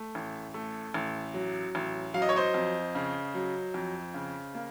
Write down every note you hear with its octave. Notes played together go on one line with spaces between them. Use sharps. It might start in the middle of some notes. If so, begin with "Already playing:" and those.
Already playing: A3
A1
A3
A1
F#3
A1
F#3 F5
D#5
C#5
C5 D#5
F2
C#3
F#3
F2
C#3
A#3